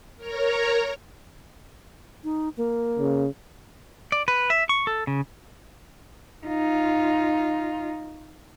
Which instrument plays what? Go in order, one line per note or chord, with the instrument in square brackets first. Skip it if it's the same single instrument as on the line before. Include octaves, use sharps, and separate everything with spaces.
[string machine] A#4 C#5 A#5
[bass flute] D#4
A#3
[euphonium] C#3
[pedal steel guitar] D5
B4
E5
C#6
A4
C#3
[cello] D#4 F4